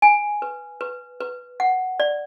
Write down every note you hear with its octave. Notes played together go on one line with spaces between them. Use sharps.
G#5
B4
B4
B4
F#5
D5